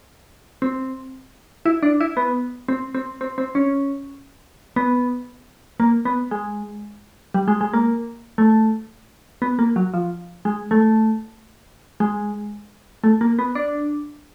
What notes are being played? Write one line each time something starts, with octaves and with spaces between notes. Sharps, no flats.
C4
E4
D4
E4
B3
C4
C4
C4
C4
C#4
B3
A#3
B3
G#3
G3
G#3
G#3
A#3
A3
B3
A#3
F#3
F3
G#3
A3
G#3
A3
A#3
B3
D4